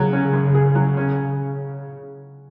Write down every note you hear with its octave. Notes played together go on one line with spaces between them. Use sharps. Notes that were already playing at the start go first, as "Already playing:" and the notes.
Already playing: C#3 F#3
C#4
F#2
G#4
F#3
C#4